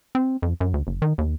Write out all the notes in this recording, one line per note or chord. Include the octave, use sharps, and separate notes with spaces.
C4
F2
F#2
D2
F#1
D#3
D#2